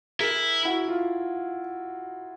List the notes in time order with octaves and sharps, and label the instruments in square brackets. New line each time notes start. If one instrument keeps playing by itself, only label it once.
[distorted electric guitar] E4 [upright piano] G#4 A#4
[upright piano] E4 F#4
F4